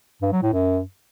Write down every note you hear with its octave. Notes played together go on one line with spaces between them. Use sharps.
G2
F#3
A2
F#2